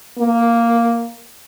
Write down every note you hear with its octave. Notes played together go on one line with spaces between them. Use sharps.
A#3